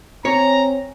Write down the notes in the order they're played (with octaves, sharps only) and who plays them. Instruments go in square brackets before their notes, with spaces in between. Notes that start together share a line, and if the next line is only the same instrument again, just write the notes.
[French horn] C4 [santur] C#4 [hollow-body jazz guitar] C#5 [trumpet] A#5